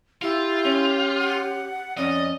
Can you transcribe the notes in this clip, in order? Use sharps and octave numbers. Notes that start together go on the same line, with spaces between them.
E4 F4 G4
C#4
F#5
F2 C#4 D5 D#5